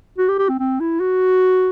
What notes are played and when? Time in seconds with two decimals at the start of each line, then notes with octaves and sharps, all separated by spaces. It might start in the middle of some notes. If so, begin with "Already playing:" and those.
0.18 F#4
0.29 G4
0.39 G4
0.49 C4
0.60 C4
0.80 E4
1.01 F#4